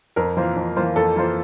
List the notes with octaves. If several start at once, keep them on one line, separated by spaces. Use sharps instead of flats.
F2 A#4
E3 A#3 F4 C5
F2
E3 A#3 F4 C5
F2 A4
E3 A#3 F4 C5